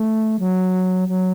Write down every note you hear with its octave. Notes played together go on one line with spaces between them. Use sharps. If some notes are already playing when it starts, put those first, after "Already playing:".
Already playing: A3
F#3
F#3